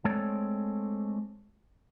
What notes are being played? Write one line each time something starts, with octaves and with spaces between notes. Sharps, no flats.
G#3 A3 C4 A4 C#5 D5